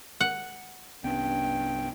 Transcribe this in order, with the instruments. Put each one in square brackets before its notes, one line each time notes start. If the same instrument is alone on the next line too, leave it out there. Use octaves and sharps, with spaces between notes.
[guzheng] F#5
[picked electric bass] C2 B3 C#4 [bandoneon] G2 G5